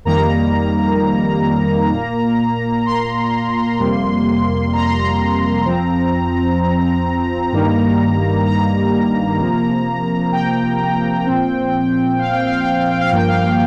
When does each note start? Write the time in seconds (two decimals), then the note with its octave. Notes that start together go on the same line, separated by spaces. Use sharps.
0.05 F2 D#3 G3 A#3 A#5
1.92 A#2 A#3
2.86 C6
3.79 F2 C3 G3 A#3
4.73 A#5
4.85 C6
4.99 A#5
5.66 F2 F3 C4
7.52 G2 D#3 G3 A#3
8.46 A#5
9.40 C3 F3 A#3
10.32 G5
11.26 A#2 F3 C4
12.19 F5
12.33 G5
12.47 F5
12.60 G5
12.73 F5
12.87 G5
13.01 F5
13.12 G2 F3 A#3 G5
13.27 F5
13.41 G5